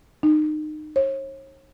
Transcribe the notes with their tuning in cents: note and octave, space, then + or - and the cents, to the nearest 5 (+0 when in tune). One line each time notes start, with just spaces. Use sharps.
D#4 -25
C#5 -40